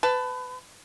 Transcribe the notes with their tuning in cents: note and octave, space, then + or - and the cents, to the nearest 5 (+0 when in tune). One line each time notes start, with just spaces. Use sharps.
B4 +25 A5 +0